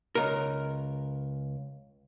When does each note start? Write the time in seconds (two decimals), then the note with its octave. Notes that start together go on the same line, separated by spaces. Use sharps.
0.15 C#2 A#4